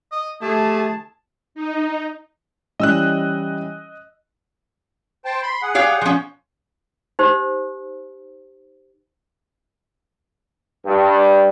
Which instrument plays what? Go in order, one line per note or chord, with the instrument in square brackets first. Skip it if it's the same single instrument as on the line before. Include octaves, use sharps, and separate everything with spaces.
[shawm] D#5
[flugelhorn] A3 [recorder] G4 [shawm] G#4 [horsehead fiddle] A5
[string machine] D#4
[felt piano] E3 G3 C#4 [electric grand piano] D#5 E6 F#6
[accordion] C5 G5 A5
B5 C6
G#4 F#5
[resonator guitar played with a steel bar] G4 C#5 F5
F3 C#4
[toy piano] D#4 G4 C5
[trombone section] G2